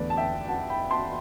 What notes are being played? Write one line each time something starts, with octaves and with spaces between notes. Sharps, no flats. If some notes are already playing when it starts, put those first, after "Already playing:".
Already playing: E2 D3 A3 B4 D5
A5
E5 G5
F#5 A5
G5 B5
A5 C6